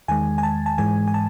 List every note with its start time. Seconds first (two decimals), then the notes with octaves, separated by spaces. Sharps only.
0.08 E2 D#3 G#3 G#5
0.38 G#5
0.43 A5
0.66 A5
0.78 G#2 E3 G#3 G#5
1.08 G#5
1.14 A5